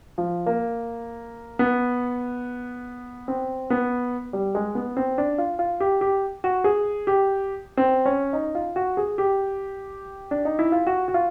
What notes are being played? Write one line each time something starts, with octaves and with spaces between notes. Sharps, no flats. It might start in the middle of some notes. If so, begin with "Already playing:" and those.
F3
A#3
B3
C4
B3
G3
G#3
B3
C4
D4
F4
F4
G4
G4
F#4
G#4
G4
C4
C#4
D#4
F4
F#4
G#4
G4
D4
D#4
E4
F4
F#4
F#4
F4